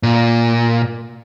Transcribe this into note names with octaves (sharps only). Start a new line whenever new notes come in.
A#2